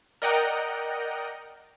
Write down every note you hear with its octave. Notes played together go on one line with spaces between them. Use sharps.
A#4 D5 D#5 F#5 G5 A#5